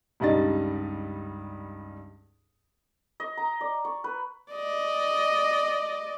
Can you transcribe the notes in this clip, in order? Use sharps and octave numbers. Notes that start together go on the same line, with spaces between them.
C#2 G2 G3 D#4 D#5 A6
D#5
A#5
D5
C#6
B4
D5 D#5